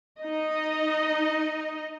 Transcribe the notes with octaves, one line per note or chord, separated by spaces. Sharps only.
D#4 D#5